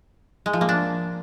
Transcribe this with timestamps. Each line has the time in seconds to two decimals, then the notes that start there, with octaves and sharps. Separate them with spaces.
0.46 G#3
0.53 F3
0.61 A#3
0.69 D4